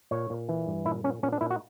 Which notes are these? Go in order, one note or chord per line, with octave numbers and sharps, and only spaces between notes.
A#2 C#5
A#2
E3
G2
A#2 E4
A#2 C#4
A#2 C#4
D4
A#2 E4
F#4